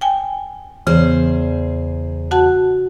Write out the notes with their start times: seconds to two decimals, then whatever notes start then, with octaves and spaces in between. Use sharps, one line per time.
0.01 G5 G#5
0.87 E2 C#3 G#4 C5
2.31 F#4 F#5 A5